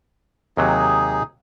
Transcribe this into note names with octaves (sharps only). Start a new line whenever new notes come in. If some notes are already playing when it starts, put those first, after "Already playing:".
D#2 C3 F#3 D#4 G#4